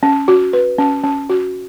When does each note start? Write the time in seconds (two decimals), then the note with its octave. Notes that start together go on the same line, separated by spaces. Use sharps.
0.03 C#4
0.28 F#4
0.53 B4
0.78 C#4
1.04 C#4
1.30 F#4